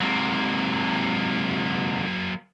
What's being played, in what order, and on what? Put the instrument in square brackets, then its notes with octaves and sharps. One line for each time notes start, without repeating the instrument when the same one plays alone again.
[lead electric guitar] G#2 C3 [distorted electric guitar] F#3 A#3